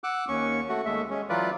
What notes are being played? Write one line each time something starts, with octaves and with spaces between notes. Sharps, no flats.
F#5 D6 E6 F#6
D#2 C#4 C#6
A3 F#4
D#2 G#3 A3 E5
G#3 C#4
E3 F#3 F4 B4 D5